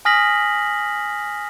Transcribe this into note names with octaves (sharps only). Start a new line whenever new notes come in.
G#5 D#6 F6 A#6 B6 F#7